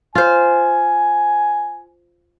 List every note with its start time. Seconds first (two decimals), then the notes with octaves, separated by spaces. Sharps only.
0.15 F4 C5 G#5